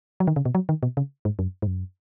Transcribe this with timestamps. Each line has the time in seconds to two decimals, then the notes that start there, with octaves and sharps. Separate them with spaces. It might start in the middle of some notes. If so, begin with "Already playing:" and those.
0.20 F#3
0.27 D#3
0.36 C#3
0.45 B2
0.55 F#3
0.69 D#3
0.83 B2
0.97 C#3
1.25 G#2
1.39 F#2
1.62 G#2
1.67 F#2